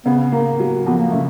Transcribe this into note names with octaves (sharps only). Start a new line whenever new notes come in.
C#3 B3
A#3
F#3
F2 B3
A#3
C#3 A3